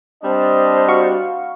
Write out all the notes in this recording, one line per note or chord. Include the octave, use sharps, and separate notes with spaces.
G3 C4 D4 C5 D#5
F#4 F5 C#6